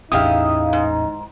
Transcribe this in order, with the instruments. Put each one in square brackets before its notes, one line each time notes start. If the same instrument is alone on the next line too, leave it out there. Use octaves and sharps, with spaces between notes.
[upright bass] A1 E2 [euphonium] D#4 [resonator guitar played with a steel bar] E4 G4 [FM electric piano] F5 D#6
[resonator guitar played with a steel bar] G#2